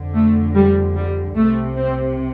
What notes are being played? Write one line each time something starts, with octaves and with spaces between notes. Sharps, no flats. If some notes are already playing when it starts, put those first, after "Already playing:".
Already playing: F2 D3
A3
G3
G3
C2 C3 A3
C4